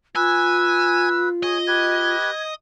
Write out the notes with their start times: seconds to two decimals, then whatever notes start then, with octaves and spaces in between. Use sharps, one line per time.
0.15 F4 B4 G#5 E6
1.43 G#4 C#5 D#5
1.67 G4 B4 G#6